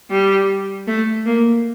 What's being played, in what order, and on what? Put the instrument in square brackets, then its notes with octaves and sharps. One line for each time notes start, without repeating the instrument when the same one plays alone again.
[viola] G3
A3
A#3